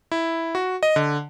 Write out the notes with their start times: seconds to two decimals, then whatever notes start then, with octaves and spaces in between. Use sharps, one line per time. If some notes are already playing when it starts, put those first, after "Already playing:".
0.12 E4
0.55 F#4
0.83 D#5
0.96 D3